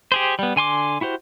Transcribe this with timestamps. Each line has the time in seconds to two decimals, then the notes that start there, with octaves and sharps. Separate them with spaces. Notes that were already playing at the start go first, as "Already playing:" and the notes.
0.12 G4 G#4 C5
0.39 G3 B3
0.56 D3 G#5 C6 D6
1.01 E4 F#4 G4 C5